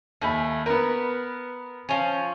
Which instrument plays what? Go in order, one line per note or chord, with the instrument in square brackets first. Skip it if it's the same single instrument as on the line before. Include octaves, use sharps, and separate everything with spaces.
[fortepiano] D#2 G#5 B5 [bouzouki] A3
[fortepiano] B3 A#4 [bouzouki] B4
[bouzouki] F3 C#4